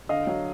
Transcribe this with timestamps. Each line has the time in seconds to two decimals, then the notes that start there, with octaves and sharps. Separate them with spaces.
0.09 D3 D#5 F5
0.27 F#3